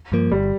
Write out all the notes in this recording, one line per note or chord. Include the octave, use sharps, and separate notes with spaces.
G2 F3 A#3
G1 G3